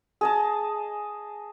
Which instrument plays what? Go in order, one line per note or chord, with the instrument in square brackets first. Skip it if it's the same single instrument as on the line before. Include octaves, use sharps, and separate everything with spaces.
[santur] G#4 D#5 A5